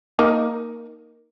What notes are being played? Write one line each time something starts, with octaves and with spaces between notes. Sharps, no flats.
A#3 D#4 A#4